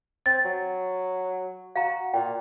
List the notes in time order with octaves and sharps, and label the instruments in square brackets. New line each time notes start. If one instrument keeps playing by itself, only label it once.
[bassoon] C4 [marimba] A6
[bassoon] F#3
[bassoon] F#4 [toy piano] F5 A#5
[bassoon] A#2 [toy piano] G5